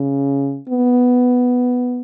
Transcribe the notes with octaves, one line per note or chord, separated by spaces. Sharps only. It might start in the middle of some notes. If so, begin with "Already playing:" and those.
Already playing: C#3
B3